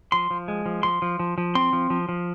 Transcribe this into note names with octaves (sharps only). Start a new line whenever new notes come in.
F3 C6
F3
G#3
F3
F3 C6
F3
F3
F3
C4 C6
F3
F3
F3